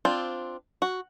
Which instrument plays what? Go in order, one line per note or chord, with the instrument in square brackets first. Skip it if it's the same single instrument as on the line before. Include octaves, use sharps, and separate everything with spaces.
[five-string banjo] C4 D4 F4
F#4